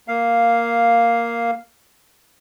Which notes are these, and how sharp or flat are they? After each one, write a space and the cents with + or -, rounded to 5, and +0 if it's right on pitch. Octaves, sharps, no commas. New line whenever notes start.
A#3 +0 F5 +0